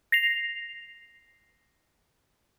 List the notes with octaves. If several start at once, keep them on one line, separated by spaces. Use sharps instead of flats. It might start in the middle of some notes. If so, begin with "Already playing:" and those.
A#6 C7 F7